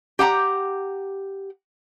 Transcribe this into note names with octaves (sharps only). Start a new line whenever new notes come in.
G4 F#5 A5 A#5